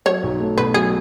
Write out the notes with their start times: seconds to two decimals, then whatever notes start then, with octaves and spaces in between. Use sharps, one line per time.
0.06 F#3 C#5
0.23 B1
0.40 A3
0.57 B2 B4
0.74 F#3 G#4